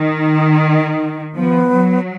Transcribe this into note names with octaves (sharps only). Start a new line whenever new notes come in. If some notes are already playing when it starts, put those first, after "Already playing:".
Already playing: D#3 D#4
F3 B3
F#3